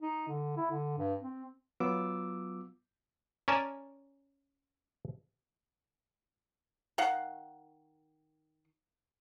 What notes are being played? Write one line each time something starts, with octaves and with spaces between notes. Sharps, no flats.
D#4
D3
E4
D3
G2
C4
F#3 B3 F4 D6 E6
C#4 A#4 D5 G#5 A5
D#3 F5 F#5